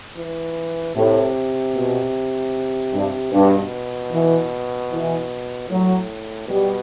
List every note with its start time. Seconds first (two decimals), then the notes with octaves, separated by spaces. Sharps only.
0.17 E3
0.95 A2 C3
1.74 B2
2.93 G2
3.32 G2 B2
4.11 E3
4.91 E3
5.69 A2 F#3
6.48 B2 G3